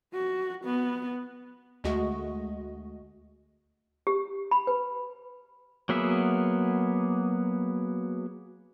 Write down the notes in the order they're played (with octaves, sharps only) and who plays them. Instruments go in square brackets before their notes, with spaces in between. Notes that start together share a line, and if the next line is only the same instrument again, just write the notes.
[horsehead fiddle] F#4
B3
[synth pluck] D2 G#3 A3 F#4 D#5
[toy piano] G4
B5
B4
[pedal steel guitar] F#3 A#3 B3 G#4 E5